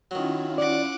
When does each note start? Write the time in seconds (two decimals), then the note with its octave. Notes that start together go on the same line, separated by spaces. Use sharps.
0.11 D#3 F#3 C#4 E4 F4
0.58 D5 F#5 D6